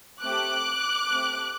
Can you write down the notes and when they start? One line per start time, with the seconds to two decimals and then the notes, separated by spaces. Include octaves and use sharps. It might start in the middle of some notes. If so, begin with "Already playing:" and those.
0.21 A3 C4 G4 D6 F#6
1.08 A3 C4 G4